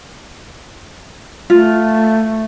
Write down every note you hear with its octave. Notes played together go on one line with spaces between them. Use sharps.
A3 F4